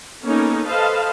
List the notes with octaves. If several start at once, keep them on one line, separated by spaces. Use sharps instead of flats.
A#3 B3 C#4 D#4 A4 A#4
A4 B4 C5 D#5 F5 A5